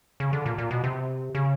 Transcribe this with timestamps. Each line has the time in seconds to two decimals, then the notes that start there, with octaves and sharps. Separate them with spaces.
0.20 C#3
0.33 D3
0.46 A#2
0.58 A#2
0.71 B2
0.84 C3
1.35 C#3